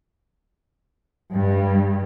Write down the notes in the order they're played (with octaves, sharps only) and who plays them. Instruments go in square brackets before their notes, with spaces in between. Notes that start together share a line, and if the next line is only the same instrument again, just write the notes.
[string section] G2